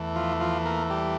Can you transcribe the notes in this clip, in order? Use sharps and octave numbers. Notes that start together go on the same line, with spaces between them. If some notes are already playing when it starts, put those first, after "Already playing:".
Already playing: E2 E3 A3
F3 F4
F3 F4
A#3 A#4
G3 G4